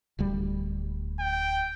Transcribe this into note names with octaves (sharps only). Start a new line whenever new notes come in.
D1 D2 G3
G5